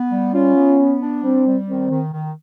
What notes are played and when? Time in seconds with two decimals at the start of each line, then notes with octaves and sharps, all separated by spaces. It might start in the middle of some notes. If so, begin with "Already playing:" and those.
Already playing: B3
0.11 G3
0.33 C#4 F4
0.55 B3
0.78 B3
1.01 D4
1.23 G3 C4
1.46 G3
1.68 D#3 C4
1.90 D#3
2.12 D#3